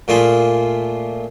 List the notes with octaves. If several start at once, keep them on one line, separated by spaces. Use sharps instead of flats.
A#2 A3 A#3 F4 G#4